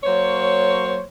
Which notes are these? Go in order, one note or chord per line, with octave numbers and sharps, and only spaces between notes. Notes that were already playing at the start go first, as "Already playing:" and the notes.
F#3 A#3 C5 C#5